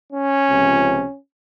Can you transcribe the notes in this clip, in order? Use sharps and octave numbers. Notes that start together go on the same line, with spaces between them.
C#4
C#2 C3 F3